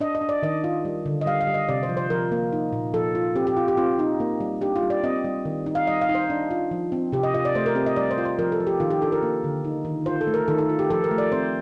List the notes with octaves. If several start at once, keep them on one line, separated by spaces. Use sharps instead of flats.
D4 D#5
D#5
D4
D5
D#3 D#5
F4
G3
D3
D#5
G3 F5
F5
G3
D#5
C3 D5
C5
F3
C5
F3 A#4
A#3
D#4
A#2
F3 A4
F4
C4 G4
G4
F4
G4
C4 F4
D#4
A#3
G3
D4 G4
F4
G3
D5
C4 D#5
G3
D#3
D#4
F5
G3 D#5
F5
D#4
C5
D4
F4
F3
C4
C3 G4
D#5
F4 D#5
D5
A3 C5
A#4
C4 G4
D#5
G3 D5
C5
F4
C5
F3 A#4
A4
F3
G4
D#3 F4
G4
D4 A4
A#4
A#3
D3
D#4
D#3
F4 C5
A4
A3
A#4
D#3 A4
A4
F4
G4
F3 A4
A#4
A3
D5
C4 C5